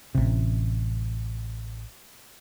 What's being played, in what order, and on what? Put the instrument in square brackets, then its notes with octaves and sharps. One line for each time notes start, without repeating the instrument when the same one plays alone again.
[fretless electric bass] A1 C3